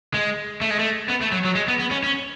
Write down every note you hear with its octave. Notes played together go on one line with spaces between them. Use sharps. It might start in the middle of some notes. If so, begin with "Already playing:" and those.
G#3
A3
G#3
A3
B3
A3
F#3
F#3
G#3
B3
B3
C#4
C#4